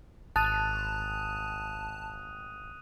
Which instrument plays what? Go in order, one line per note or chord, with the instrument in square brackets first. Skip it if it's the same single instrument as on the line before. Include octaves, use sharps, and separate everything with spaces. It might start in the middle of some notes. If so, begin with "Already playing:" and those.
[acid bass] G#1 [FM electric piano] A5 [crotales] D#6 D#7 [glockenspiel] F#6